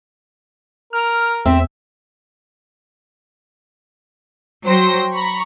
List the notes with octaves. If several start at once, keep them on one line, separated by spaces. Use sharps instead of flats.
A#4 F6
E2 C4 E5
F#3 C5 G5 C6 A#6
A#5 B5 C#6